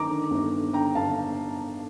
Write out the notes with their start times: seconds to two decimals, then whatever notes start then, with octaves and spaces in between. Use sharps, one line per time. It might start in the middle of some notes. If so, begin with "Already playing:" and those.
Already playing: D#3 A#5 D6
0.09 D3
0.31 G1
0.53 D3
0.73 D3 G5 A#5
0.95 G1 F5 A5